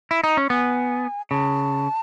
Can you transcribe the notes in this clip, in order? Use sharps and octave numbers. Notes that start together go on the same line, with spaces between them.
E4
D#4
C#4
B3 G#5
C#3 A5